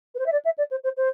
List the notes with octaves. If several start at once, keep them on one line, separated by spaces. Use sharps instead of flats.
B4
C5
E5
D5
E5
D5
C5
C5
C5